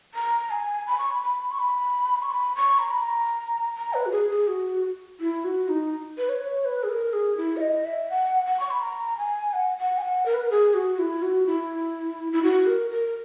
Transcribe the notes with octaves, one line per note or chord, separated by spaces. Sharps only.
A#5
G#5
B5
C#6
B5
B5
C#6
B5
C#6
B5
C#6
A#5
B5
A#5
A#5
B4
F#4
G#4
G#4
F#4
E4
F#4
D#4
B4
C#5
B4
G#4
A#4
G#4
E4
E5
D#5
E5
F#5
F#5
C#6
B5
A#5
G#5
F#5
F#5
G#5
F#5
A#4
B4
A#4
G#4
F#4
E4
F#4
E4
E4
F#4
A#4
A#4